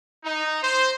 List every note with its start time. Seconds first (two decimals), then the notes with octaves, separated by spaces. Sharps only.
0.25 D#4
0.63 C5